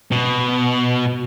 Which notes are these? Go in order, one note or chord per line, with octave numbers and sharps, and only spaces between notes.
B2